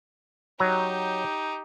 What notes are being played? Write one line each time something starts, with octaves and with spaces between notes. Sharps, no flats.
F#3 D#4 G4 A#5